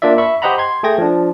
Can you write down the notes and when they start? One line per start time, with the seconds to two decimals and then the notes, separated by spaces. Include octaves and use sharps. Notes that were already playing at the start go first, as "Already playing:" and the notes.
0.02 A#3 D4 F4 D5 E5
0.18 E5 B5 C#6
0.42 G4 C5 D#5 F#5 A#5 B5
0.58 C6 G#6
0.83 A3 G#4 G5 G#6 A#6
0.98 F3 D4